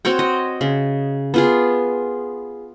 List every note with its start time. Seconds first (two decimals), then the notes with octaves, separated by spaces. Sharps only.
0.05 C4 F#4 C#5 G5
0.19 D#5
0.61 C#3
1.34 B3 F4 G#4